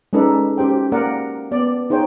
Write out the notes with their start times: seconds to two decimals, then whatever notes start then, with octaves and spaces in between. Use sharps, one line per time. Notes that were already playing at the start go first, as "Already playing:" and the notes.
0.13 G#3 C#4 D#4 A4 B4 D5
0.58 C#4 G4 C5 G5
0.74 F#4
0.92 A#3 A#4 D5 F#5
1.51 B3 D5
1.90 D#4 G#4 C5 C#5 G5